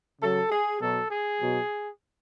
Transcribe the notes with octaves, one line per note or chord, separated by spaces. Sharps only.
C#3 F#3 A4
G#4
B2 F#3 A4
G#4
B2 F#3